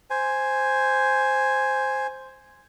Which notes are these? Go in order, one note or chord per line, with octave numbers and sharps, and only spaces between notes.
C5 G#5